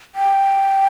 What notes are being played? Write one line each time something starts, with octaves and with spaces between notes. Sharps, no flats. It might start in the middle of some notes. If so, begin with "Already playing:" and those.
G5